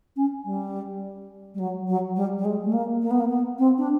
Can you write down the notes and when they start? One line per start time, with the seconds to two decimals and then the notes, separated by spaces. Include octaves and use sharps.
0.16 C#4
0.45 G3
1.54 G3
1.59 F#3
1.88 F#3
2.16 G3
2.38 G3
2.45 G#3
2.64 A3
2.73 A#3
3.02 A#3
3.11 B3
3.20 A#3
3.30 B3
3.59 C4
3.78 D4